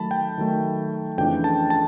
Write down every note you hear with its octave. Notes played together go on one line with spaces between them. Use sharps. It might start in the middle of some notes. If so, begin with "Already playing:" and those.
Already playing: D#3 F#3 A3 A5 B5
G5
D#3 F#3 A3
F2 C#3 E3 A3 D4 G5
A5
A5